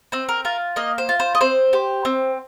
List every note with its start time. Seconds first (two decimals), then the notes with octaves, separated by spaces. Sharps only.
0.12 C4 C5
0.29 A#4
0.45 F4 A#4
0.76 A#3 D#5
0.98 C5
1.09 F4
1.20 C5
1.35 D#5
1.41 C4 C5
1.73 G4
2.05 C4